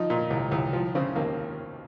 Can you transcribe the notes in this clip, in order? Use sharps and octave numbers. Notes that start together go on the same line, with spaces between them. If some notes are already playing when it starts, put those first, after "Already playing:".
Already playing: F3 D#4
A#2
C2
C2
F3
C#3 C4
D#2 A#3